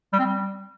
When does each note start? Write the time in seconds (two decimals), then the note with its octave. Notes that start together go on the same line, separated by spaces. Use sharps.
0.13 G3
0.19 C4
0.25 G3